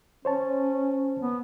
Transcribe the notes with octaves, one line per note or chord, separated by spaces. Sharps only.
C#4 C5 C#5 A5
B3